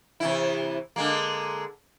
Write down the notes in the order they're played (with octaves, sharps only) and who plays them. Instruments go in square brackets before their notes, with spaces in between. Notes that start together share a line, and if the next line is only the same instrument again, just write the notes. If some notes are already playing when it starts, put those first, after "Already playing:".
[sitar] C3 E3 E4
D3 G#3 A#3